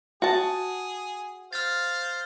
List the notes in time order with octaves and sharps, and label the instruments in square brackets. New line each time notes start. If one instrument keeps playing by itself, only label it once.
[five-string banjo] F#4 A5 [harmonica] G#4
[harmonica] C5 F5 [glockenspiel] F6 A6